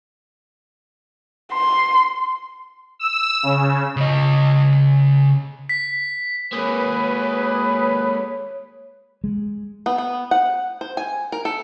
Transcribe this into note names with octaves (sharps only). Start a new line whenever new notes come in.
C6
E6
C#3
C#3 D#5
B6
G#3 A#3 F#4 G#4 B4 C#5
G#3
B3
B3
F#5
C5
G#5
A#4
A4